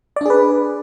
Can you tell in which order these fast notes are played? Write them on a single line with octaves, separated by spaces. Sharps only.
D5 D4 G#4 B4